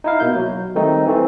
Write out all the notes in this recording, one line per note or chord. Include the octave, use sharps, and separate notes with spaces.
D#4 E4 F5
B2 A#3 G6
F#3
D#3 G3 A3 C4 D#4
E3 A3 C4